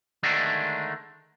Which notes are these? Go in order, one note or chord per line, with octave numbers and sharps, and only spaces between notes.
D3 D#3 G#3 A3 D4